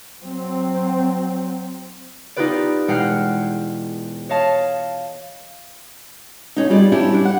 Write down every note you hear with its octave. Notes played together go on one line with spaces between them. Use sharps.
F#3 C4
B3 D#4 F4 G4 B4 D5
E1 G#3 F#5 G5 F6 C7
C#5 D#5 F5 A5
A2 C#4 D#4
G3 F4 G#4 D5 D#5
G3 C#4 D4 E4
G3 D4
F#5